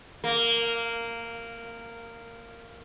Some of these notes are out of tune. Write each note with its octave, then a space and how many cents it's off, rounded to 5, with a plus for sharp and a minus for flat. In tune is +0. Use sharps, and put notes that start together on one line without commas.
A#3 -10